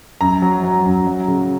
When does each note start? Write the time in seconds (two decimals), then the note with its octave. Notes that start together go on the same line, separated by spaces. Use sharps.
0.21 F#2 A#5
0.42 F#3
0.63 F#3
0.85 F#2
1.07 F#3
1.28 C#3